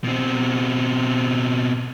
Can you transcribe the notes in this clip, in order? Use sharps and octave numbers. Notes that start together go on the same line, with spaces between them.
B2 C4